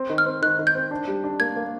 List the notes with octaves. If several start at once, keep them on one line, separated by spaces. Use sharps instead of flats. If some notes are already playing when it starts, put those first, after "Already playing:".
Already playing: C4
D#3
F6
C4
D#3 F#6
D#3
G6
C4
D4
G3
D4
A#3 G#6
A#3